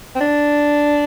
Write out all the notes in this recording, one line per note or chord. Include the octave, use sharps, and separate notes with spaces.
C4
D4